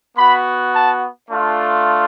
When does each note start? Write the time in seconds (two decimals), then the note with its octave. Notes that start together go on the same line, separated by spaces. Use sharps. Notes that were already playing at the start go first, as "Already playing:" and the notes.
0.17 B3 F#4 B5
0.74 A5
1.31 A3 D4 F4